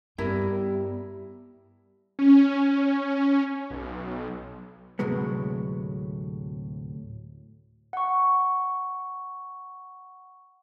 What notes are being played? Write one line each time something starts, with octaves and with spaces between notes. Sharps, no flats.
G2 G3 B3 E4 G4 A#4 G5
C#4
B1
D2 A2 C3 F#3 G#3 B3
F#5 C#6